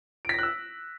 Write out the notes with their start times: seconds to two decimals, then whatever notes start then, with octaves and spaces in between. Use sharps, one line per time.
0.25 D7
0.29 B6
0.34 A#6
0.39 F#6
0.43 E6